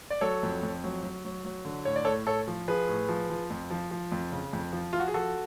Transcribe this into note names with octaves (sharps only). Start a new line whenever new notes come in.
D5
F#3 A4 C#5
F2
F2
F#3
F#3
F#3
F#3
D3
A2 C#5
D5
A2 A4 C#5
A2 A4 C#5
F3
F3 G#4 B4
A2
F3
F3
F2
F3
F3
F2
C#3
F2
F3
F3 F4
F#4
G#4
F3 F#4 A4